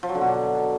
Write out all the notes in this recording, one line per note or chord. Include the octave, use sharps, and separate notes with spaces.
F3
F#3
D3
B2
D4